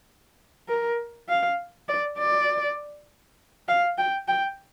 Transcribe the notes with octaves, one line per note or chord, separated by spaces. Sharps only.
A#4
F5
D5
D5
F5
G5
G5